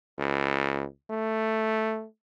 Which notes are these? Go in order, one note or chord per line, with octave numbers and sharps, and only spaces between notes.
C#2
A3